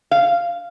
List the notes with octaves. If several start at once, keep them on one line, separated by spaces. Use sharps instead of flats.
F5